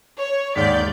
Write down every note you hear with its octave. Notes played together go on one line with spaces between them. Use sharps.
C#5
D#2 G#2 D5 G6 B6